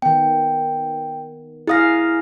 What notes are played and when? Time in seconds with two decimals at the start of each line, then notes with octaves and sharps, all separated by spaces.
0.02 D#3 B3 G5
1.68 E4 G#4 F5 D#6 A#6